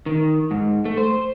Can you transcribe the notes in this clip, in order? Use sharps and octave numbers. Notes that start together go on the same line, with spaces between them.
D#3
G#2
A3
C5